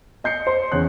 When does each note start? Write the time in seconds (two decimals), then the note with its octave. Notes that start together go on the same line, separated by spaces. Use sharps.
0.24 D#5 G6 C7 C#7
0.47 C5 C6
0.72 E2 C#4 F#6